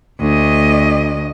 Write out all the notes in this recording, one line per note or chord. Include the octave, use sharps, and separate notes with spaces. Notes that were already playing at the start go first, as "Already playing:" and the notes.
D2 D#5